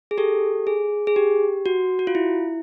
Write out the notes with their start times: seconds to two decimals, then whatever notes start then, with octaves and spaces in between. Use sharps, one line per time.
0.11 G#4
0.18 G4 A4
0.67 G#4
1.07 G#4
1.16 G4
1.66 F#4
1.99 F#4
2.07 F4
2.15 E4